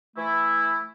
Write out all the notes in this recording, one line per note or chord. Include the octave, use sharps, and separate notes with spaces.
E3 A3 E4